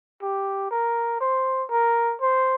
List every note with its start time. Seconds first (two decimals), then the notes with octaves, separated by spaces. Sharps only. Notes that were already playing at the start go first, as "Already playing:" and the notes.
0.22 G4
0.71 A#4
1.21 C5
1.70 A#4
2.21 C5